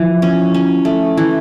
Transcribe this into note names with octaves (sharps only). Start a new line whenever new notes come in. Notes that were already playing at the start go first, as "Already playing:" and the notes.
Already playing: E3 F3
C#4
C#4
A3
E3